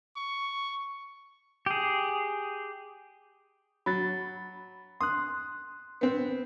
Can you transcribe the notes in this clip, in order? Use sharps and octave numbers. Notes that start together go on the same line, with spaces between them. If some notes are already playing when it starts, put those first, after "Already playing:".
C#6
G4 G#4
F#3 B5 A6
C6 D#6 F#6
B3 C4